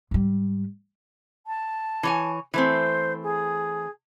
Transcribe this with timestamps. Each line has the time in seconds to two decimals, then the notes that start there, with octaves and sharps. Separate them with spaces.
0.11 G#2 G3
1.46 A5
2.03 E3 C#5 G#5
2.54 E3 A3 C4 C5
3.23 G#4